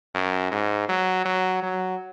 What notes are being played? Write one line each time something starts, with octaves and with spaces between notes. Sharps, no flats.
F#2
G#2
F#3
F#3
F#3